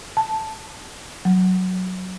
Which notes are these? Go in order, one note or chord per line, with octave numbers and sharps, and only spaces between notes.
A5
F#3